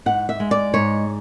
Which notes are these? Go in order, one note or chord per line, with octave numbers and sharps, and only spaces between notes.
G#2 F#5
E5
G#3
D5
G#2 C#5